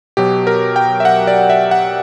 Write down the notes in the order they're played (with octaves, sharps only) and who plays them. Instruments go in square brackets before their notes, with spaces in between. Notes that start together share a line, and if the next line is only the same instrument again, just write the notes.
[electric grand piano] B2 F#3 G4
A#4
G5
E5
F#5
D5
E5
F#5